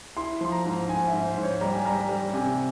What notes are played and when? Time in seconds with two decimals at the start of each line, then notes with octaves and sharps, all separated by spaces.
0.16 E4 C6
0.41 F3 C6
0.52 A#5
0.65 G#2
0.89 G#2 G#5
1.07 E5
1.13 G#2
1.25 C5
1.37 G#2
1.43 C#5
1.61 G3 A#5
1.73 G#5
1.85 G3 A#5
2.09 G3
2.33 C3 G#5